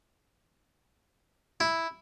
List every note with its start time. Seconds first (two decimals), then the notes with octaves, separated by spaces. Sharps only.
1.60 E4